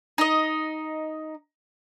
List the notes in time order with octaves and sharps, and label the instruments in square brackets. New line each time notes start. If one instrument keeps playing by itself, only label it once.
[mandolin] D#4 D#5